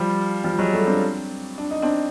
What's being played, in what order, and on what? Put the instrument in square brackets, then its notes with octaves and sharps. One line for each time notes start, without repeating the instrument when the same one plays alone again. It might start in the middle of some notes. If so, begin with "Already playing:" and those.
Already playing: [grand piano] F3 G3
F3 G3
F#3 G#3
G3 A3
C4 D4
D4
D#4
C4 D4